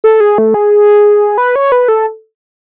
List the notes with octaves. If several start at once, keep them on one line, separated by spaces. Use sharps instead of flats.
A4
G#4
A3
G#4
B4
C#5
B4
A4